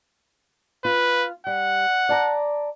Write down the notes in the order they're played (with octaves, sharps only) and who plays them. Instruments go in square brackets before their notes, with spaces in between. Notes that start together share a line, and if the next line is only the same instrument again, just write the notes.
[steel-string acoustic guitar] F4 [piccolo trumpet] B4
[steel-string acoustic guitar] G3 [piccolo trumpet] F#5
[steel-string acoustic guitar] D5 A5 A#5